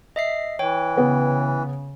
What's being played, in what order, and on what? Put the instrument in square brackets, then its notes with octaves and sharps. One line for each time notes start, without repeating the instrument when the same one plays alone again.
[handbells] D#5 E5 C7
[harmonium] E3 [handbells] C#5 G5
[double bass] C#3 [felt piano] B3